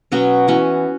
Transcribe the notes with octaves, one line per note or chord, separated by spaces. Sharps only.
B2 F#3 B3 C#4 F#4
E3 B3 C#4 F#4